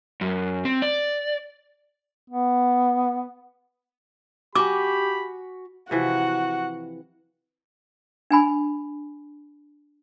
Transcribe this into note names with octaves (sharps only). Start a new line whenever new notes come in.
F#2
C4
D5
B3
F#4 G4 G#5 B5 D6
C3 E3 F3 F#4 F#5
D4 G#5 B5